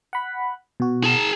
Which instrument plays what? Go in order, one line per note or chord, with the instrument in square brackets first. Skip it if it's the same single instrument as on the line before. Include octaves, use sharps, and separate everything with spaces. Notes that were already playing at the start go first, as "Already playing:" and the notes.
[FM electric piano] F#5 B5
B2 F#4
[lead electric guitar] G#4 A5